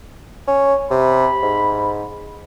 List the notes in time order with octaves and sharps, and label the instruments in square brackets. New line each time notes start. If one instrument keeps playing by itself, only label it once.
[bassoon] C#4
[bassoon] C3 [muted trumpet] B5
[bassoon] G#2